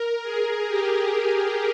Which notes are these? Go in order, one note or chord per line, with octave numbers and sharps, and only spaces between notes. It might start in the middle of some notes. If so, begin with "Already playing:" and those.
Already playing: A#4
G#4
G4
G#4